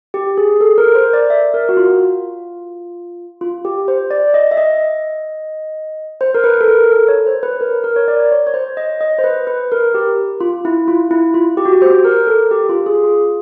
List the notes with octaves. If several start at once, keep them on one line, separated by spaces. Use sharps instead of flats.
G4
G#4
A4
A#4
C5
D5
E5
A#4
F#4
F4
F4
G4
C5
D5
D#5
E5
D#5
C5
A#4
B4
A4
A#4
A4
C#5
C5
B4
A#4
A#4
C#5
D5
C#5
C#5
C5
D#5
D#5
C5
B4
B4
A#4
G4
F4
E4
F4
E4
F4
G4
F#4
G4
C5
A#4
A4
G4
F4
G#4
F4